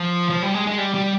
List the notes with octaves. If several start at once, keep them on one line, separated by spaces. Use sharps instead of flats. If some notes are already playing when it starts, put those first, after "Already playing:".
Already playing: F3
F3
G3
G#3
G#3
G3
G3